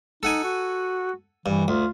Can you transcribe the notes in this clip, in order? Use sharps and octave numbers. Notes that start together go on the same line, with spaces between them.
D#4 A4 F#5 G#5
F#4
G2 E3
D2 F4